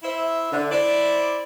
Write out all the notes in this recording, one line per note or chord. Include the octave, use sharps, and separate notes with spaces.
E4 C5 E5
D3
E4 C5 D5